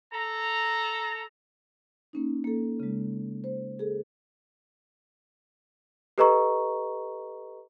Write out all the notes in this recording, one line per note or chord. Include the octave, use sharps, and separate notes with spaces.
A4 A#5
A#3 C#4 D#4
A#3 A4
C#3 G#3
C5
G#4 A4
G4 A4 B4 D#5 A#5 C#6